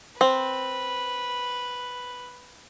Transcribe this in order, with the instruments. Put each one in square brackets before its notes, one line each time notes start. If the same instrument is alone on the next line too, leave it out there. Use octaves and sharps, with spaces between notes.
[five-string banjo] C4 [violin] B4